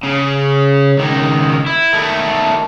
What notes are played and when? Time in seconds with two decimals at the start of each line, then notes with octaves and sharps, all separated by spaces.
0.04 C#3
0.98 C#2 D#3
1.66 E4
1.93 D#3 A3